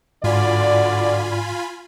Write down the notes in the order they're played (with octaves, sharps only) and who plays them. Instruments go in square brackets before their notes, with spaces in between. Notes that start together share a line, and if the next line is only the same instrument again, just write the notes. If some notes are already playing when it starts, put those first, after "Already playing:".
[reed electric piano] G#2 [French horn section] D3 F#4 D5 [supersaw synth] F4 G#5 B5